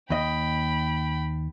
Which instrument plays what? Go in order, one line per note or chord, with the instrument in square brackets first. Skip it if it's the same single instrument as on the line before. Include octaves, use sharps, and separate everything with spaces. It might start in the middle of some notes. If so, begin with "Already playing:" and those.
[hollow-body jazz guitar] D#2 D#5 [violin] G5 B5